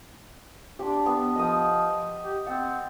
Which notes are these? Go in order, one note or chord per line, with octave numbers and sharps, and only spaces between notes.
D4 G4 C6 D6
B3
F3 D#5 A#5 D#6
G4
C4 F#5 A5